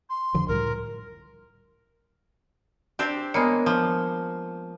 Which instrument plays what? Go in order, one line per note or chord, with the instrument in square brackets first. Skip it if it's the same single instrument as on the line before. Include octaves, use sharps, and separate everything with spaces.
[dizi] C6
[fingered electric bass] F2 D3 F3
[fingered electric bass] C#2 A2 G3 [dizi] A#4
[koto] C4 D4 G4
[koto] G#3 A#3 [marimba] B3 C#5
[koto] F3